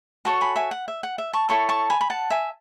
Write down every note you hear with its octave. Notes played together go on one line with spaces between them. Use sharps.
F#4 A4 C#5 A5 C#6
G#5 B5
E5 G#5
F#5
E5
F#5
E5
A5 C#6
E4 A4 C#5 A5 C#6
A5 C#6
G#5 B5
B5
F#5 A5
E5 G#5